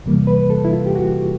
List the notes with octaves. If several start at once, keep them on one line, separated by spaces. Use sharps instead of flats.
E2 C3 E3 G3 A#3
B4
A4
E4
F4
G4
F#4